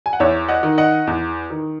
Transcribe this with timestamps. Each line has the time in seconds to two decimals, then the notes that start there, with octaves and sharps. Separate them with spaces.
0.06 G#5
0.13 F#5
0.20 E2 C#5 E5
0.48 D#5 F#5
0.63 D#3
0.78 D#5 F#5
1.07 E2
1.50 D#3